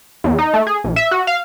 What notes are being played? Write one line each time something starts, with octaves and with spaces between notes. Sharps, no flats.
E2
D#4
A3
G#4
A#1
E5
F#4
F5